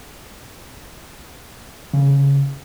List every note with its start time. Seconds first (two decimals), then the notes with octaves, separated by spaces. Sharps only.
1.94 C#3